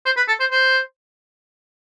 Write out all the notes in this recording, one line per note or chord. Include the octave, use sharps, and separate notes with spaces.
C5
B4
A4
C5
C5